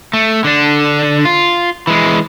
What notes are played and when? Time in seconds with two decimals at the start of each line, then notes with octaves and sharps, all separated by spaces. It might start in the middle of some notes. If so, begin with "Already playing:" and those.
0.13 A3
0.44 D3 D4
1.25 F4
1.87 E3 G#3